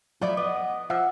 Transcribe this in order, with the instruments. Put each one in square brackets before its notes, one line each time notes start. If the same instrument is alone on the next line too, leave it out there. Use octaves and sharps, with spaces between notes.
[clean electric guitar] F3 F#3 F4 [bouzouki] A3 E4 D5
[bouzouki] B3 [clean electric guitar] D5 [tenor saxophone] D#5
[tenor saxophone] F3 [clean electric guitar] E5 [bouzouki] F#5